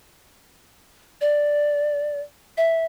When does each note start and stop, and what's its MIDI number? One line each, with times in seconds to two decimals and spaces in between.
1.21 2.21 74
2.57 2.85 76